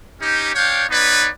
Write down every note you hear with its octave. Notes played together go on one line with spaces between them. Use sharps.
C#4 D#4 G4
D4 C#5 F5 G5
B3 D#4 B4 C#5 D5